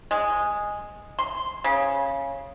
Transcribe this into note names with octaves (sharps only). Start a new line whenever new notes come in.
G#3
C6
C#3